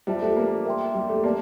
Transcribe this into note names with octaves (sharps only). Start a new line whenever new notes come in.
G3 F4 C5 E5 A5
A3
A#3
A#4 E5 G5 C6
G3
A3
A#3 G4 A#4 D5 A5